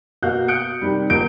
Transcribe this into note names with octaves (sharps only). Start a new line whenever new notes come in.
B2 A#3 F#4 F5 F#6 G6
D#6 F#6 G6 C#7 D7
C3 D#3 G3
D#1 A#2 G6 D7